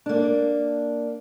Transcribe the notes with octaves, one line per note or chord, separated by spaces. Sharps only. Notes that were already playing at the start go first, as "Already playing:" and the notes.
A#3 D4